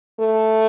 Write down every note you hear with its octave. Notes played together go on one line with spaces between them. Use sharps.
A3